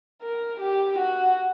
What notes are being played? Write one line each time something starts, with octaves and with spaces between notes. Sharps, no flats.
A#4
G4
F#4